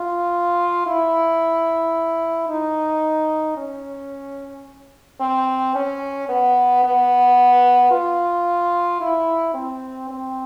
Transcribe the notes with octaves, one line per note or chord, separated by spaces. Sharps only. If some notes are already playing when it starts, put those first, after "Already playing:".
Already playing: F4
E4
D#4
C#4
C4
C#4
B3
B3
F4
E4
C4
C4